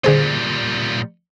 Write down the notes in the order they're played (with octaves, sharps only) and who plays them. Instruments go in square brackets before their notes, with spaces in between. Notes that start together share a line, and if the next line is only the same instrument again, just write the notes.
[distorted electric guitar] A#2 G3 [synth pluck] D3 G#4 C5